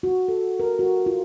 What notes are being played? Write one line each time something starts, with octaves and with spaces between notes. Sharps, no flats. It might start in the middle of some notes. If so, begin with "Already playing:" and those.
F#4
A4
A#4
F#4
F4